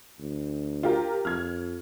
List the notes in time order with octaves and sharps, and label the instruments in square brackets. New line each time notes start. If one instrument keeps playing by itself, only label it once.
[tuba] D2
[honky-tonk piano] F4 G4 A#4
[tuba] F2 [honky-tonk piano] F6 G#6